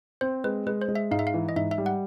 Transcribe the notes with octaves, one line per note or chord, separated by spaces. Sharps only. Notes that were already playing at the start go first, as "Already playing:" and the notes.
C4 C5
G#3 B4
G#3 B4
C5
G#3
E5
G#2 F5
E5
F5
E3
D#5
G#2 E5
E5
G3
F#5